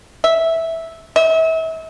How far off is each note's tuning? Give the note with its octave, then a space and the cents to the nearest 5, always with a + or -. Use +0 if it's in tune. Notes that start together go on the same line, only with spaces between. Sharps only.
E5 -10
E5 -35